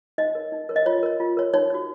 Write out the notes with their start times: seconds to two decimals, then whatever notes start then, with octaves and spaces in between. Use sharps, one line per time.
0.18 D#4 D#5
0.35 A#4 C#5
0.52 D#4
0.69 A#4 C#5
0.76 D#5
0.86 F4 C#5
1.03 A#4 C#5
1.20 F4
1.37 A#4 C#5
1.54 D#4 C#5
1.70 F#4 C#5